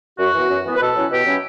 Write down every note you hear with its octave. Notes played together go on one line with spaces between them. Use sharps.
F#2 F#4
E3 B3
F#2
E3 B3
B4
B2 A4
F#3 C#4 E4
B2 G4
F#3 C#4 E4